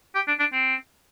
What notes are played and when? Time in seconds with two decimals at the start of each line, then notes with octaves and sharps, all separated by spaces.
0.15 G4
0.28 D4
0.39 D4
0.53 C4